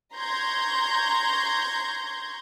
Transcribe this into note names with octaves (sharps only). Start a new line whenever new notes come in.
A#5 C6 C#6 G6 G#6 A#6